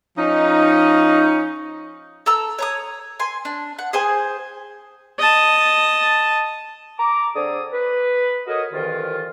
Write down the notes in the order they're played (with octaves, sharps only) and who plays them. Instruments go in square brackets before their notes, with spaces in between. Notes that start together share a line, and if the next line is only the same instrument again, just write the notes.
[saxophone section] F3 C#4 D#4
[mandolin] A4 A#5 E6
C#5 A#5 D#6
G#5 C6
D4
F#5
G#4 C5 G#5
[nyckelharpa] D#5 A5
[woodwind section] A#5 D6
D3 C4 G#4 A4 D5 D#6
B4
F#4 A4 A#4 C#5 D#5
C2 F2 D#3 E3 F4